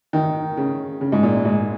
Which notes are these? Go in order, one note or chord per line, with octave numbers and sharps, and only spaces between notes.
D#3
C#3
C#3
G#2
A#2
G#2